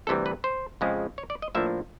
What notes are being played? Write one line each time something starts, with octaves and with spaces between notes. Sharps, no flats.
D2 C3 E3 G3 A4
B4
C5
F2 C#3 F3 G#3
C#5
D5
D#5
A2 F3 A#3 D4 E5